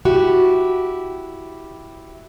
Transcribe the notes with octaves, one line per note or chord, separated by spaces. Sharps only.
E4 F#4 G4